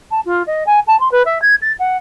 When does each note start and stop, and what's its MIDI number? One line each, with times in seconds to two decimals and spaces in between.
0.11 0.20 81
0.25 0.43 65
0.46 0.63 75
0.66 0.80 80
0.87 0.98 81
1.00 1.11 84
1.11 1.23 71
1.25 1.41 76
1.42 1.55 92
1.62 1.72 93
1.79 1.97 78